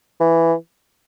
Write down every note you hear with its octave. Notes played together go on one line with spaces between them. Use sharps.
E3